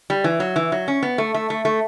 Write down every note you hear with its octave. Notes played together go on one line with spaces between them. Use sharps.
G3
E3
F#3
E3
F#3
C#4
B3
A3
A3
A3
A3